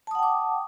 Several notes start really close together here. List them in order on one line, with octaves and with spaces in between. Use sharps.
A5 D#6 F#5 G5 D6